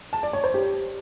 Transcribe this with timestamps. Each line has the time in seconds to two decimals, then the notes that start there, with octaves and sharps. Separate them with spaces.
0.13 A5
0.23 D5
0.33 C#5
0.44 C5
0.54 G4